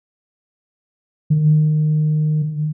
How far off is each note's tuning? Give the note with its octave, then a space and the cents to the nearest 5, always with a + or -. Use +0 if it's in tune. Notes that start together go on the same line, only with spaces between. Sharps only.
D#3 -25